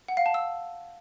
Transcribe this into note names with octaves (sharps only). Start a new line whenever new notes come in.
F#5
F5
A5
E6